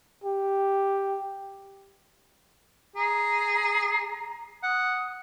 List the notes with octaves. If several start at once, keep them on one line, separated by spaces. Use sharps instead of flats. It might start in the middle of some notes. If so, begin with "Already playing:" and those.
G4
G#4 A#5
F#5 D#6